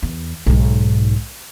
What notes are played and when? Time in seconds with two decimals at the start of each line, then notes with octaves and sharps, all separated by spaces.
0.03 E2
0.46 B1 G#2